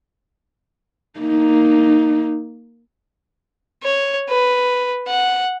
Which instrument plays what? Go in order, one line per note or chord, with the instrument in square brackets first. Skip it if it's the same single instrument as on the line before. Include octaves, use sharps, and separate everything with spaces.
[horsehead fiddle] A#3 D#4
[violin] C#5
B4
F#5